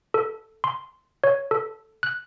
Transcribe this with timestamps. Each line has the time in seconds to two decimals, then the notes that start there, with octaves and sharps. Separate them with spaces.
0.14 A4
0.64 C6
1.24 C#5
1.51 A4
2.03 F#6